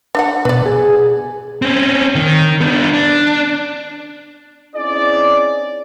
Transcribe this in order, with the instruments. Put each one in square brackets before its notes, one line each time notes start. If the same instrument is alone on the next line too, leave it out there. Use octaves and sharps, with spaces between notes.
[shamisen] D4 F5 F#5
[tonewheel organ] B2 [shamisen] B4 D5
[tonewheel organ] G#4
[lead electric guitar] C4 C#4
D#3
B3 D4
D4
[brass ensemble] C4 C#4 D#4 E4 G#4 D5